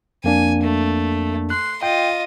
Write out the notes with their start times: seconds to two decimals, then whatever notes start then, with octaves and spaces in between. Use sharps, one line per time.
0.24 F2 A#3 D4 G#5
0.64 A3
1.50 C6 F#6
1.83 F4 D#5 G5